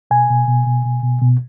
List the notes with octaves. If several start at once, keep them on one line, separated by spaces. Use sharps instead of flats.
B2 G#5
B2
B2
B2
B2
B2
B2